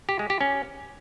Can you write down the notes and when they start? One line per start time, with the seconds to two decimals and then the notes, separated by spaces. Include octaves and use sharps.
0.09 G4
0.19 G#3
0.30 G4
0.41 C#4